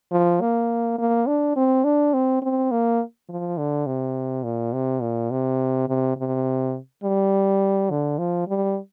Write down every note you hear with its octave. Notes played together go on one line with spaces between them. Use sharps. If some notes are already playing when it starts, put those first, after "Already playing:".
F3
A#3
A#3
D4
C4
D4
C4
C4
A#3
F3
D3
C3
A#2
C3
A#2
C3
C3
C3
G3
D3
F3
G3